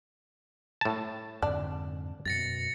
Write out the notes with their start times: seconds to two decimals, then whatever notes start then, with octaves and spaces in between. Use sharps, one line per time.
0.81 A2 A5
1.42 F2 G#2 D3 D4
2.26 F#2 B2 A6 A#6 C#7